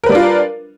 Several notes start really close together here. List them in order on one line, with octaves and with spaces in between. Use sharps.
A#4 B4 G3 D4 F4